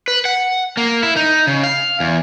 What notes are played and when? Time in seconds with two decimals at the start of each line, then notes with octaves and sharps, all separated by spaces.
0.08 B4
0.25 F#5
0.77 A#3
1.03 E4
1.16 D#4
1.47 C#3
1.63 F5
2.00 E2